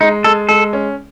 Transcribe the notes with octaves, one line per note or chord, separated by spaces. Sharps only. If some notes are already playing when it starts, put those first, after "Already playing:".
G#3 D#4
G#3 A4
G#3 A4
C#4